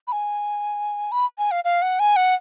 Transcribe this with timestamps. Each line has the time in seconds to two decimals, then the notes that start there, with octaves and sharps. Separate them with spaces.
0.08 B5
0.12 G#5
1.12 B5
1.38 G#5
1.51 F5
1.64 F5
1.82 F#5
2.00 G#5
2.16 F#5